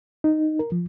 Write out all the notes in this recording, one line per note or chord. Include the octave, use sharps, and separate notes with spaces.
D#4
A#4
F3